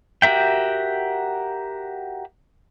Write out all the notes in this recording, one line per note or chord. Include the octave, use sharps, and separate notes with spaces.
F#4 G4 A#4 E5 G5